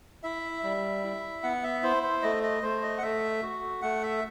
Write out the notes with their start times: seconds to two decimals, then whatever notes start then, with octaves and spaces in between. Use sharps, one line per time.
0.23 E4 E5
0.63 G3
1.04 E4
1.43 B3 F#5
1.63 E5
1.83 E4 C5
2.03 C5
2.23 A3 D#5
2.43 D#5
2.63 A3 C5
2.83 D#5
2.98 F#5
3.02 A3 E5
3.42 F#4
3.82 A3 F#5
4.03 E5